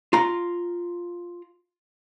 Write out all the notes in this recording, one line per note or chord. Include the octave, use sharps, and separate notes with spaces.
F4 A#5